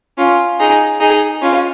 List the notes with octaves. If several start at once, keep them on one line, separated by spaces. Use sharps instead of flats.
C#4 F4
D#4 G#4
D#4 G#4
C#4 F4